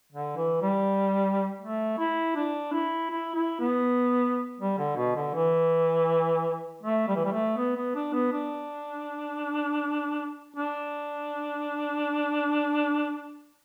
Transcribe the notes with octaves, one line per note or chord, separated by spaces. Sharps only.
D3
E3
G3
A3
E4
D4
E4
E4
E4
B3
G3
D3
B2
D3
E3
A3
G3
E3
G3
A3
B3
B3
D4
B3
D4
D4